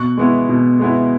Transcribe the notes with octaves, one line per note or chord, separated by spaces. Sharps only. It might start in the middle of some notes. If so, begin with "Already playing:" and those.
Already playing: B2 C#6 F#6
G#3 B3 E4
B2
G#3 B3 E4